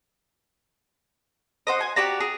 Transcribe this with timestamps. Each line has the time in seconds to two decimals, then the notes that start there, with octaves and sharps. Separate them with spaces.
1.67 F#4 C5 D#5
1.81 G#5
1.96 F#4 G4 D5 A#5
2.20 G#4